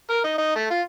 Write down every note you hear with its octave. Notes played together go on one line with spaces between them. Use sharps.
A#4
D#4
D#4
A3
F4